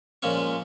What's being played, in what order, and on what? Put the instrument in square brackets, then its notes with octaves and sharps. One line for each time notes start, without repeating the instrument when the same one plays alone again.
[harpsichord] A#2 F3 G#3 C#4 C#6